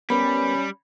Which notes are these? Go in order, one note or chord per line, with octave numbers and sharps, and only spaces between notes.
G3 B3 C#4 A#4 B4 B5